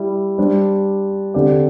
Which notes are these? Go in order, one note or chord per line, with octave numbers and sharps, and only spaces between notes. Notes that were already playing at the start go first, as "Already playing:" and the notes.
Already playing: G3 E4 D5
G3 D4 C5
D3 C4 G4 D5